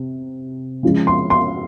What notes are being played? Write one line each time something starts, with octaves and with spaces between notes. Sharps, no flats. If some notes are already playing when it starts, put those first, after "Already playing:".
Already playing: C3
C#3 F3 G#3
C6
C6